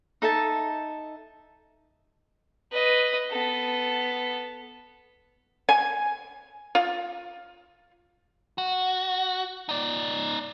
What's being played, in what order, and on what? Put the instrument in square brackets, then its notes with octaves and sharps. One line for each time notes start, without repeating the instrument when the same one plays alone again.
[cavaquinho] D#4 A4 E5 A5
[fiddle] B4 D#5
B3 A4
[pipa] G#5
F4
[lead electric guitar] F#4
D#4 D5